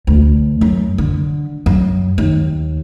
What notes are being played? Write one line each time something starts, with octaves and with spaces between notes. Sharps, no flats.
D2
F#2
D3
F#2
D#2